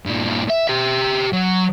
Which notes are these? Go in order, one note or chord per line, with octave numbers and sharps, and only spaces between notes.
G2 A#2
E5
G4 E5
F#3